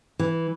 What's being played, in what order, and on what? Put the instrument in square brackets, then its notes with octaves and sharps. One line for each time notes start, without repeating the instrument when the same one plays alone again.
[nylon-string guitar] E3